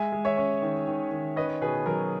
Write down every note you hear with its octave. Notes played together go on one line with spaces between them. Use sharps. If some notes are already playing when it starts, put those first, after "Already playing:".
Already playing: G#3 E5 G#5
G#3
C#5 E5
C#4
D#3
D#3
D#3
C#4 B4 D#5
B2 G#4 B4
F#3 A#4